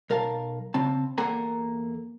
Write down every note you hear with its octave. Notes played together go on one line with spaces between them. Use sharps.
B1 A#4 F5 A5
C#3 C4 A5
E2 A#3 A4 F#5 G#5 A#5